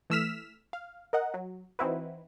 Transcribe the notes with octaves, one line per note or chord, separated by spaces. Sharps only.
E3 A3 E6 F6 B6 E7
F5
A#4 D#5 F#5
F#3
E3 C4 D#4 E4 F#4 B4